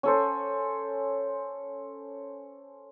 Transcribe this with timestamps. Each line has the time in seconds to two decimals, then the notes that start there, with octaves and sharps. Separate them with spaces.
0.03 C#4 A4 C5